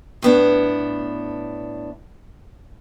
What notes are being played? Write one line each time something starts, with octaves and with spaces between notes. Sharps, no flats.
A2 B3 D4